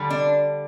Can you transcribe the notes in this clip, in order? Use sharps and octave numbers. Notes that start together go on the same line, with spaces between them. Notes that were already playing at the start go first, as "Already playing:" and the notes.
Already playing: D3 G3
D4